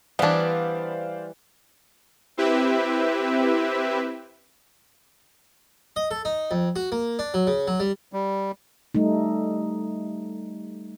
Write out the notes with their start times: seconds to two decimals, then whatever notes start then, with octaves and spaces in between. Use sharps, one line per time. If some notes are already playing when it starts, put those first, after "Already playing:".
0.19 E3 G3 B3 D4 C5 D5 F5
2.37 C4 E4 G4 B4 E5
5.96 D#5
6.11 A4
6.25 D#4
6.51 F2
6.76 F#4
6.92 A#3
7.19 D4
7.34 F#3
7.47 C#3
7.67 F#3
7.80 G3
8.13 G3
8.95 G3 A3 D#4